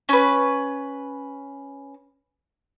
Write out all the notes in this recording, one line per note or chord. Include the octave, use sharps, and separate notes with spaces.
C#4 B4